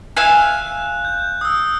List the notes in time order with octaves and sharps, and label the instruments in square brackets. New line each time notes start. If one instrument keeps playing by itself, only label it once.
[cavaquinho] E5 F5 G#5 [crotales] F#6
[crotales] G6
D#6 E6